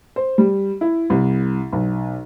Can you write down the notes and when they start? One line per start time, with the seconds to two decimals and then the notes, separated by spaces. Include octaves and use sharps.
0.16 C5
0.38 G3
0.81 E4
1.10 C2
1.72 B1